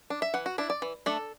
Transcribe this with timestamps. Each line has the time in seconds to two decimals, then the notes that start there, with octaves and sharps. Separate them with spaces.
0.10 D4
0.22 E5
0.34 E3 F#5
0.46 F#4
0.58 D4 E4
0.70 D5
0.82 E3
1.06 A3 D4 A4